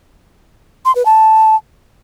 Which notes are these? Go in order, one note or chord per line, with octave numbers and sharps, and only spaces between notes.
C6
B4
A5